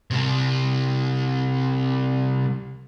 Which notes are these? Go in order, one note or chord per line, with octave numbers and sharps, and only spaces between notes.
C2 C3